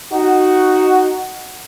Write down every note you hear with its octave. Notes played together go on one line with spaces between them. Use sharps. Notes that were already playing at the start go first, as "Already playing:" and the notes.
D#4 F#4